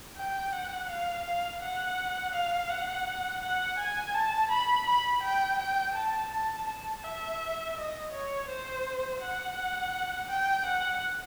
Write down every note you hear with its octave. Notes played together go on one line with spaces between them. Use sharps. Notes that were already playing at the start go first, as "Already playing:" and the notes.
G5
F#5
F5
F5
F#5
F5
F#5
F#5
G#5
A5
B5
B5
G5
G5
A5
A5
A5
E5
D#5
C#5
C5
F#5
G5
F#5